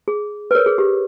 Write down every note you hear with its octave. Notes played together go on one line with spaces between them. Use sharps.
G#4
B4
A#4 C#5
G#4
G4